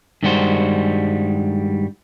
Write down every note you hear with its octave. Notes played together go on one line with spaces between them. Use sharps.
G2 D#3 G3 G#3 F#4 C5